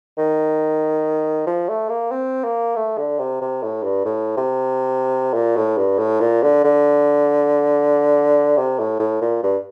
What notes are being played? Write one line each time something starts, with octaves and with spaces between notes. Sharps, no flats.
D#3
F3
A3
A#3
C4
A#3
A3
D3
C3
C3
A2
G2
A2
C3
A#2
A2
G2
A2
A#2
D3
D3
C3
A2
A2
A#2
G2